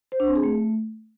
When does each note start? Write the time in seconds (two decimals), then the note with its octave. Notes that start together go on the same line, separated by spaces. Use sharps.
0.12 C5
0.20 D4
0.28 C4
0.36 G#4
0.43 A3